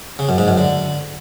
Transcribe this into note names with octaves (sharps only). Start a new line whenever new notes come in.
C#3
F#2
G#2
F#2
D3